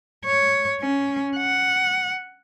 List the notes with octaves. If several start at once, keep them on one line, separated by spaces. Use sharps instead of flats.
C#5
C#4
F#5